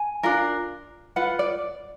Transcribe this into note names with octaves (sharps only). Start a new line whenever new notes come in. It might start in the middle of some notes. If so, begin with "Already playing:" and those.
Already playing: G#5
D4 F4 A#4
F4 B4 F#5
D5